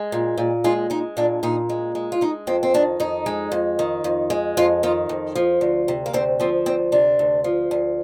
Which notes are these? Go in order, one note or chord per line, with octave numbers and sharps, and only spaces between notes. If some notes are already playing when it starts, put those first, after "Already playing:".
Already playing: G#3
A#2
A#2
G#3 F4
G#3 D#4
A#2 D4
A#2 D#4
G#3
G#3
F4
G#3 D#4
F2 C4
C4
D#3 D4
F2 D#4
G#3
F2
D#3
F2
G#3
F2 F4
D#3 F4
F2
F3
D2
C3
A#3
D2 C4
F3 C4
D2 C4
C3 D4
D2
F3
D2